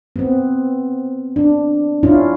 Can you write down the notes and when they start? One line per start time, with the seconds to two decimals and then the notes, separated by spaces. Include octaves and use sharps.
0.16 B3 C4
1.36 D4
2.03 C#4 D4 E4 F4